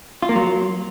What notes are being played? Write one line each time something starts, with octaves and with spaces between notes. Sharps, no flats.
F4
A#3
F#3